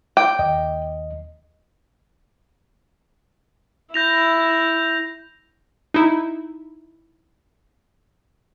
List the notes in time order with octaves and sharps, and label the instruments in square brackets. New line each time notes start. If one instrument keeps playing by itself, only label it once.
[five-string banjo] G5 [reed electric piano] D6
[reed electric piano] D#2 D#5
[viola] E4 [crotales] G6 A#6 F7
[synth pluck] D#4 E4